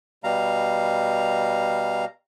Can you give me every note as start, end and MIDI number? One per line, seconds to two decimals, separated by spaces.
0.24 2.05 47
0.24 2.05 55
0.24 2.05 77
0.24 2.05 82